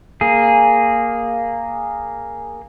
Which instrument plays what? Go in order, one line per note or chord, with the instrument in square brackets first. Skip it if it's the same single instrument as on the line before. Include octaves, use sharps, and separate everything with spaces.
[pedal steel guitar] A#3 G#4